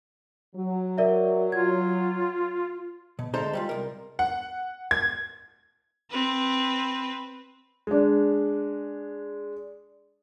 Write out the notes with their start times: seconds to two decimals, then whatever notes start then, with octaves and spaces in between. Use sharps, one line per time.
0.55 F#3
0.98 A#4 D5 E5
1.52 F4 G#6
3.19 B2
3.34 D2 G#3 D#4 A4 C5 A#5
3.53 G3 G#3 F4
3.69 C2 A#4
4.19 F#5
4.91 G#6
6.10 C4 B4
7.87 G#3 D4